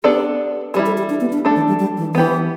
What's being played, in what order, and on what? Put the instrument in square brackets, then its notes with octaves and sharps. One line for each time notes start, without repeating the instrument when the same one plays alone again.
[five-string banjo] B3 D4 A4 D5 [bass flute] G4
[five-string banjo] E3 G3 E4 [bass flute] G4
[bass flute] A4
G4
D4
B3
D4
[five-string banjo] A3 D4 A4
[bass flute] E3
G3
G3
E3
[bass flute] E3 [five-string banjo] B3 G4 B4